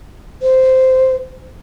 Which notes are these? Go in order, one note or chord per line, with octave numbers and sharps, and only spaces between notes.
C5